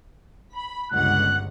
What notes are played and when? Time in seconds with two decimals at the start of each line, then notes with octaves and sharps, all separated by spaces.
0.54 B5
0.92 G1 C#2 F#5 F#6